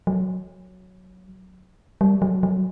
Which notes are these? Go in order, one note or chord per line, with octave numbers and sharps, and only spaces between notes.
F#3
G3
F#3
F#3